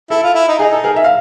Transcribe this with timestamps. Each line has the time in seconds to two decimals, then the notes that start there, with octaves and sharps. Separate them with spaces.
0.10 E4 A4
0.23 F4
0.35 E4
0.48 D#4
0.59 D#4 G#4
0.72 A4
0.84 G#4 A#4
0.96 E5
1.04 F5